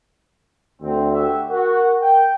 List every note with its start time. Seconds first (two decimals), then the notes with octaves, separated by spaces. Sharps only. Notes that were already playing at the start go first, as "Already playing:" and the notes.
0.82 D2 C4
1.13 F#4 G4 E5
1.51 F#4 A#4
2.02 G5